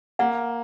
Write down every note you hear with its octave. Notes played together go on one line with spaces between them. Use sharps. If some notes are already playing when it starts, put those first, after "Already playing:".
A#3 F#5